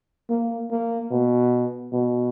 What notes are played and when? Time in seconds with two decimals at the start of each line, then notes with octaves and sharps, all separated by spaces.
0.30 A#3
0.71 A#3
1.11 B2
1.92 B2